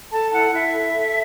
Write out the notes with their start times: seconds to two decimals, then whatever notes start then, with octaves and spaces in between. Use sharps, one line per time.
0.12 A4 A5
0.32 E4 F#5
0.52 E4 E5
0.73 A4
0.93 A4